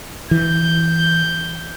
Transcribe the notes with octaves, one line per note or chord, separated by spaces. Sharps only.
E3 G6